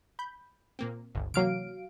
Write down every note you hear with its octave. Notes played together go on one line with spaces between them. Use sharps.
B5 G6
A#2 A#3 C4
G1 C#2
C3 E3 F#3 A#3 F5 D7